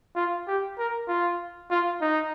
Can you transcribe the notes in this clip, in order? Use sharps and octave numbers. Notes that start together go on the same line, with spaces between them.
F4
G4
A#4
F4
F4
D#4